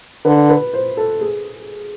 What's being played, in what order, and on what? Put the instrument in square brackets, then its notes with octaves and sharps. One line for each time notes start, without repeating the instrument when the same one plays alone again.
[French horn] D3 [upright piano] B4
[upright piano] B4
C5
A4
G#4